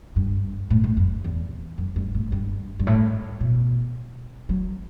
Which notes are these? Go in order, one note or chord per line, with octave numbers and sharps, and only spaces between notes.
G2
A2
A2
F#2
E2
F#2
G2
A2
G2
G2
A2
B2
F#3